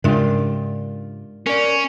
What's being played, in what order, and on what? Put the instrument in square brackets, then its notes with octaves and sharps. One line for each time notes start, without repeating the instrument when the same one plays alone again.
[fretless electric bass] G#2 C#3 [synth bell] G#3 A#4 [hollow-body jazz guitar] D4 F4 G4
[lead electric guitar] C#4 [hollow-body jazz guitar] A#4 D5